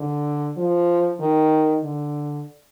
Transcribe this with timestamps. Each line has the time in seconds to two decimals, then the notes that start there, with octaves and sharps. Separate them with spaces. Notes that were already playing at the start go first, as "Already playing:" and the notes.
Already playing: D3
0.57 F3
1.20 D#3
1.84 D3